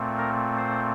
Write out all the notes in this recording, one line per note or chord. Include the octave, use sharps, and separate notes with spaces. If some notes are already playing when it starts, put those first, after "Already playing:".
Already playing: A#2 A3 C4
A#4
C5